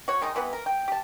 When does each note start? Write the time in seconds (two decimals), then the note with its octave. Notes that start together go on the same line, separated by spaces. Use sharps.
0.08 F#4 C#5
0.22 D#3 G#3 D#4
0.35 C3 E3 B3 B4
0.53 A#4
0.66 G5
0.88 G4 A5